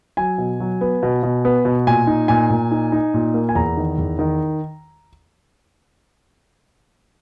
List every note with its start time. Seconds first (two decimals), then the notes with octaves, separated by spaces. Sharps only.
0.17 F#3 G#5
0.38 B2
0.60 F#3
0.81 B3
1.03 B2
1.23 B2
1.45 B3
1.65 B2
1.87 A#2 G#5
2.07 D#4
2.28 A#2 G#5
2.50 A#2
2.71 D#4
2.92 D#4
3.14 A#2
3.34 A#3
3.49 G#5
3.55 E2 A#5
3.77 D#3
3.98 E2
4.19 D#3